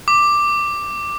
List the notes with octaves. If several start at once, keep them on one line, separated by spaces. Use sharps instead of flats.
D6